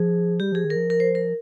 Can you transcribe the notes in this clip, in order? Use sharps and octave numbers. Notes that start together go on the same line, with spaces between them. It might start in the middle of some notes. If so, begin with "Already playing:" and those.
Already playing: F3 G#4
G3 G4
F3 G#4
D#3
A#4
F3
A#4
C5
A#4